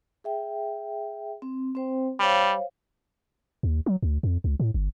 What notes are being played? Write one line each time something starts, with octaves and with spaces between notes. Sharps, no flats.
G#4 E5 G5
C4
C4 C5 G5
G3 C5 C#5 F5
D#2
F#3
D2
F2
C#2
A2
G1